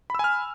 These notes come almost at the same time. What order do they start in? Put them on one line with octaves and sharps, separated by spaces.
B5 E6 G#5 F6